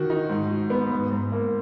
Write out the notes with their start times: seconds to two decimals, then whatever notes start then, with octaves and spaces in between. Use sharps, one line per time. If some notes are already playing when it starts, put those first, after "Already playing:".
Already playing: D#3 F#4
0.10 D#4
0.29 G#2
0.50 F#4
0.70 B3
0.91 G#2
1.11 G#2
1.32 A#3